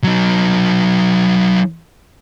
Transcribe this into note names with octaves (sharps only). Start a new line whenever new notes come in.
F#3 D#4